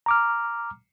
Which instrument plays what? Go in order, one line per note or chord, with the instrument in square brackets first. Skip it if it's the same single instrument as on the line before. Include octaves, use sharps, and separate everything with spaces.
[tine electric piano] A#5 D6 F6